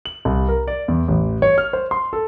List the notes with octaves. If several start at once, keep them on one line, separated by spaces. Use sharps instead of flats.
F#7
C2
A#4
D5
E2
A1
C#5
F6
C5
C6
A4